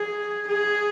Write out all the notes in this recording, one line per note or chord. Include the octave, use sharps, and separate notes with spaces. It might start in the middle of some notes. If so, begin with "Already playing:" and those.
Already playing: G#4
G#4